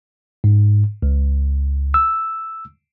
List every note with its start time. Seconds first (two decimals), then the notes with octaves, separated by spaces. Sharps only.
0.44 G#2
1.02 C#2
1.94 E6